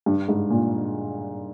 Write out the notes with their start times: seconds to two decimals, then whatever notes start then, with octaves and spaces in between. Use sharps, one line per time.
0.06 G2
0.28 G#2
0.50 A#2